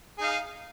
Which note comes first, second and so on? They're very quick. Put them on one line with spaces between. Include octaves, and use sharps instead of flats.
G#4 D#4 F5